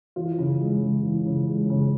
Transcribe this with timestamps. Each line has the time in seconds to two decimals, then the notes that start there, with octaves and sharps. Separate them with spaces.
0.16 E3 F4
0.38 C#3
0.60 G#3
0.82 C#3
1.04 E3
1.26 C#3
1.48 G#3
1.70 C#3